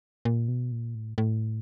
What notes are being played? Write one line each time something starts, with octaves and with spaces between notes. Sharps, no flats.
A#2
B2
A#2
A2
A2